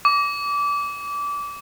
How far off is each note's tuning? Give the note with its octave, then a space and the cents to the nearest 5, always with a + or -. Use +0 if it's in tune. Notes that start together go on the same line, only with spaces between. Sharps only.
D6 -25